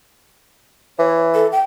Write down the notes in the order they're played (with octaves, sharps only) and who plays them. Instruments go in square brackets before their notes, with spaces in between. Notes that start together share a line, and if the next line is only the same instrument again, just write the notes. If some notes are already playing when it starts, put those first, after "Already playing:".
[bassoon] E3 [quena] C#5
[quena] A4
G5